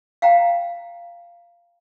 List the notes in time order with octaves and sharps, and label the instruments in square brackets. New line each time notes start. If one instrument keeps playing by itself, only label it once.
[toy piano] F5 G5 A#5